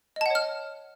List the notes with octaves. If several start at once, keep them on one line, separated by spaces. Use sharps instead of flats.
C#5 D#5 F#5 A5 F6